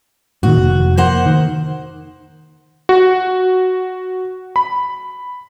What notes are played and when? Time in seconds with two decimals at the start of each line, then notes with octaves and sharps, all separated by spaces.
0.43 G2 A#2 D#3 F#4
0.57 F1
0.97 A#3 C5 F#5
1.26 D#3
2.89 F#4
4.56 B5